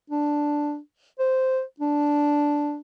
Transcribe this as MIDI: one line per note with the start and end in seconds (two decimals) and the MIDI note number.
0.10 0.78 62
1.19 1.62 72
1.80 2.79 62